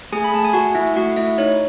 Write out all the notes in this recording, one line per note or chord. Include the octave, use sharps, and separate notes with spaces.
A3 G#4 G#5
B5
A3 A5
G#5
A3 F#4 F#5
A3 E4 E5
A3 F#4 F#5
A3 E4 E5
D#4 C#5